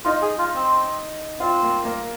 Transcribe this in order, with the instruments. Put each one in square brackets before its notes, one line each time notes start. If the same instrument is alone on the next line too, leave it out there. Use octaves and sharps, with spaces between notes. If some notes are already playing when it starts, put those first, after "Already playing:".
[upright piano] D#4 [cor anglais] F4
[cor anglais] G#4
F4
C4
[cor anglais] C4 [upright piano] F4
[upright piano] A#3
A#3